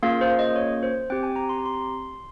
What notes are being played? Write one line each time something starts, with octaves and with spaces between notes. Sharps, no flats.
A#3 C#4 F4 G#4 F5
C5
D#5
C#5
C5
C4 G4 G5
G#5
A#5
C6
A#5
C6